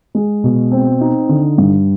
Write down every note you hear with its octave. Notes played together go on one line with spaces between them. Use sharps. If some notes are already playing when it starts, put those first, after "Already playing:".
G#3
B2
C4
D#4
D3
G2